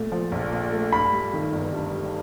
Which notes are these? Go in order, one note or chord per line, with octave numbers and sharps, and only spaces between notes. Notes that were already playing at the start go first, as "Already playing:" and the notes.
Already playing: A#2 A3
F3
A#1
A#2
A3
G2 B5
G3
D#3
G1
G2
G3